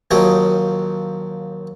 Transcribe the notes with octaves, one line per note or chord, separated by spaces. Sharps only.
D#2 F3 F#3 D#4 G4 D#5